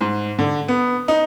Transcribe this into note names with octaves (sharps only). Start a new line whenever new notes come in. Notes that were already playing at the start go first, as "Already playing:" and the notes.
G#2
D3
B3
D#4